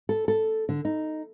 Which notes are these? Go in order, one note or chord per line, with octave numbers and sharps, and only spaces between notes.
A4
A4
D3
D#4